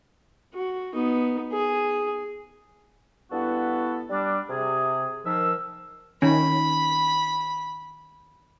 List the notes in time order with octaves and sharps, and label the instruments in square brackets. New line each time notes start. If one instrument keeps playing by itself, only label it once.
[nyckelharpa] F#4
B3 D#4
G#4
[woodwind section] G2 B3 E4 F#4 A4
G3 D4
C3 G#4
D#3 F3 A#4 E6
[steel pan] D#3 C#4 [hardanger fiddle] B5